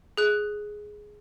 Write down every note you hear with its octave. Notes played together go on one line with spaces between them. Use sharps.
G#4 F#6